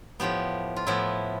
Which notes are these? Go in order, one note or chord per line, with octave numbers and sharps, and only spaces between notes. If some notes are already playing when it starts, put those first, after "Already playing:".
A2 F3 B3 G4
F4
A2 F3 B3 E4